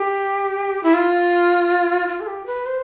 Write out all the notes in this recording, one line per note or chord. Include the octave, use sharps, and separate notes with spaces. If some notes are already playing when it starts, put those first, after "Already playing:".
Already playing: G4
E4
F4
F4
A4
G4
B4
C5